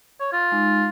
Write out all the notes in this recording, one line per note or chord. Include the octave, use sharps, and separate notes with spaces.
C#5
F4
G#3 D#4